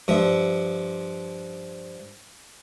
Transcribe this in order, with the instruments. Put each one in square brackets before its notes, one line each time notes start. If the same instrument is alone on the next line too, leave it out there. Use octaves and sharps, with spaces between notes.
[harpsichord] G2 F3 E5